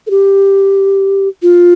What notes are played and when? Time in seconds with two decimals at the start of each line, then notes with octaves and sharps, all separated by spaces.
0.07 A4
0.10 G4
1.42 F4